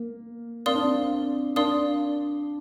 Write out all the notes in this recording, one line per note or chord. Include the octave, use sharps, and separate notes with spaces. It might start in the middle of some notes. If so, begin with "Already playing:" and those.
Already playing: A#3
C4 A#4 D5 F5 C6 D#6
D4
C4
D4 A#4 D5 F5 C6 D#6